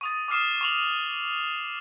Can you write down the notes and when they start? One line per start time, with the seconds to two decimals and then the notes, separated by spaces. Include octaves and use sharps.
0.01 C#6 D#6 A6
0.28 D6 D#6 F6 C7 E7
0.61 C#6 F7 F#7